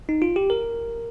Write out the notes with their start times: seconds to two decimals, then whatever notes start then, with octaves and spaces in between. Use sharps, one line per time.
0.09 D#4
0.22 F4
0.36 G4
0.50 A#4